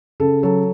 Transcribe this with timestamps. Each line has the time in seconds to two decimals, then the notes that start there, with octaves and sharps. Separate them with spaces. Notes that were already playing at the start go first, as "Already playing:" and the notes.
0.20 C#3 A4
0.43 F#3 A4